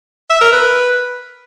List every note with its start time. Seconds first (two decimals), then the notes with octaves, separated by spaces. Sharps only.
0.30 E5
0.41 A#4
0.53 B4